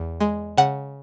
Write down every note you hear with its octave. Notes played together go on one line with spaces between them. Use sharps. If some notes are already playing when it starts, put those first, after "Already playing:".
Already playing: E2
G#3
C#3 F#5